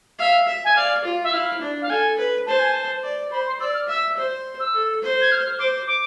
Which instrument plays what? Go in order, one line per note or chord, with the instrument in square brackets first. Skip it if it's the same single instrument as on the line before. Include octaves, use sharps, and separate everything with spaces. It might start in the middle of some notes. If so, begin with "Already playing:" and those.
[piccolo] E5 [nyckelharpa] F5
[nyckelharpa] E5
[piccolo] G#5
[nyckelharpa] D5 [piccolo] F5
[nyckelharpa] F4
[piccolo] E5
[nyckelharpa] E4 [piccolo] F5
[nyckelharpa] D4
[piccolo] F5
[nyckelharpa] A4 [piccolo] G#5
[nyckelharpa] B4
[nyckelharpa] C5 [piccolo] A5
[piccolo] G#5
A5
[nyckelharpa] D5
[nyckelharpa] C5 [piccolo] B5
[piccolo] C6
[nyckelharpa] D5 [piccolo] E6
[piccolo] F6
[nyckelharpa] E5 [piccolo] E6
[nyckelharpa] C5
[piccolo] E6
[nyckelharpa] A4
C5
[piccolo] G#6
F6
F6
[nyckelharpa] C5 [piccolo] D6
[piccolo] D6